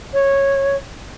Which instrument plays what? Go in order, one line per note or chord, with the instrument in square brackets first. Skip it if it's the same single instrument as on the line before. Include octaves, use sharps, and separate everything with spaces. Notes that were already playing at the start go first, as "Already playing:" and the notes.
[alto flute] C#5